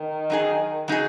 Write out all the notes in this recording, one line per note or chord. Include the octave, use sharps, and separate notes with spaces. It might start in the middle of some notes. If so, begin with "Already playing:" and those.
Already playing: D#3
F#3 D#4 G#4
F#3 D#4 G#4